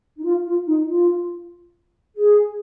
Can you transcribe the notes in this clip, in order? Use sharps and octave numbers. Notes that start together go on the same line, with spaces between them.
D#4
F4
F4
D#4
F4
G#4